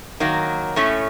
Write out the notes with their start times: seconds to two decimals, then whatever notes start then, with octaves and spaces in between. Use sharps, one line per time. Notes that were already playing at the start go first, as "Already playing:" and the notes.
0.20 D#3 F#3 A#3
0.76 A2 A3 C#4